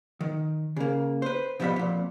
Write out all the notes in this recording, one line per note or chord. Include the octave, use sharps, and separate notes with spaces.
D#3
C#3 A#3
B4 C5
B2 F3 G3 E5 F#5 B5
F2 A#2